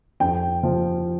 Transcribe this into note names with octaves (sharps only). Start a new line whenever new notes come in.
F2 G5
F3